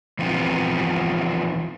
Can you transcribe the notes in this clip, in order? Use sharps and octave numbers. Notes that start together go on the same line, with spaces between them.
E3 F3 B3 C4 D#4 F4